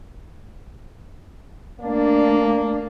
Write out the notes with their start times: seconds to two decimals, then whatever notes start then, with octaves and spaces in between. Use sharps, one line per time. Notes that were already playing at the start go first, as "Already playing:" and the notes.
1.80 A3 A#3 D4